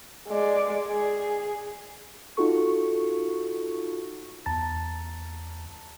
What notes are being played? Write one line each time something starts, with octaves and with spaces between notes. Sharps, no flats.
G#3 D5
G#4
D#4 F4 F#4 A4 C#6
E2 A5 A#5 A6